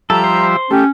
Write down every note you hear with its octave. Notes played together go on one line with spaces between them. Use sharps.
F3 G3 A4 E5 A#5
C5
A3 C#4 G4